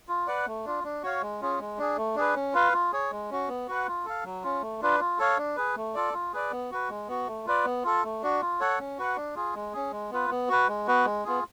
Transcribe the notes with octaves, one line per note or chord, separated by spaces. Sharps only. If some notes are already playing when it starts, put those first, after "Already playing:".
F4
B4 D5 F#5
A3
D4 F4
D4
F#4 C#5 F5
G#3
C#4 F4 G#4
G#3
D4 G#4
A3
D4 G#4 B4
C#4
F4 B4 F5
F4
G#4 C#5
G#3
C#4 F#4
B3
F#4 B4 F#5
F4
A4 F5
F#3
C#4 F4
A3
D4 F4 B4
F4
A4 C#5 F5
D4
G#4 B4
A3
F4 A4 D5
F4
G#4 B4 D5
B3
F#4 B4
G#3
B3 F#4
A3
F4 B4 D5
B3
F4 A4
A3
D4 F#4
F4
A4 C#5 F#5
C#4
F#4 B4 F#5
D4
F4 G#4
G#3
C#4 G#4
G#3
B3 F4 B4
B3
F#4 B4
G#3
B3 F#4 B4
G#3
B3 F4 G#4